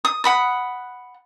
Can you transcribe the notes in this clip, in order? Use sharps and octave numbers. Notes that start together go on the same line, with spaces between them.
D#6
F#5 B5 D#6